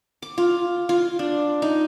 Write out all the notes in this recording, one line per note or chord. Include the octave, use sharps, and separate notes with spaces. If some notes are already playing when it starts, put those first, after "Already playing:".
D6
F4
F4
D4
D#4